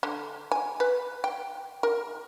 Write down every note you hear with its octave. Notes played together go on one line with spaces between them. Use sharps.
D3
G#5
B4
G5
A#4